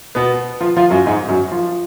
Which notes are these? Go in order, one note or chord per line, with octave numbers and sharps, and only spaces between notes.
B2 B3
F3 F4
F3 F4
F#2 F#3
G#2 G#3
F#2 F#3
F3